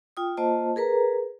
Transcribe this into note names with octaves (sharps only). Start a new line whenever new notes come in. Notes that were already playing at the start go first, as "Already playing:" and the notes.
F4 G5 D#6
A#3 F4 C5 D#5 A5
G#4 A#4 B4 A#5